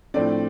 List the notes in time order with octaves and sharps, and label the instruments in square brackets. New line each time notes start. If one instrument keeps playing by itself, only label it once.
[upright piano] A2 F3 A3 C4 D4 D5